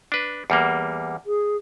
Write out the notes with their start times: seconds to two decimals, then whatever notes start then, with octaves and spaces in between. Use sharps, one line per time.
0.12 D4 B4
0.50 E2 G3 A#3
1.26 G#4